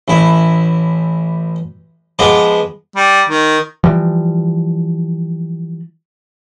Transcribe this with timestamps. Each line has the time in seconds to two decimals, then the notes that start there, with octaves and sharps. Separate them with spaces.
0.08 A1 E4
2.19 F3 G#3 B3 D6
2.96 G3
3.28 D#3
3.84 E3 F3 G3